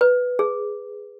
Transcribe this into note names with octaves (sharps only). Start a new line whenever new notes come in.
B4
G#4